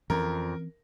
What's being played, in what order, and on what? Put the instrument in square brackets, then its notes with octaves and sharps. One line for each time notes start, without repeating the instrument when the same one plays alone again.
[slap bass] F2 [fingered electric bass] E3 C4 C#4 [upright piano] A#4